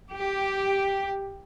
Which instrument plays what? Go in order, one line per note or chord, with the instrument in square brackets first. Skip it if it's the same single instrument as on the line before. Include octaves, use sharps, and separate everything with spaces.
[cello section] G4